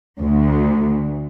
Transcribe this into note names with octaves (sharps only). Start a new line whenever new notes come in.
D2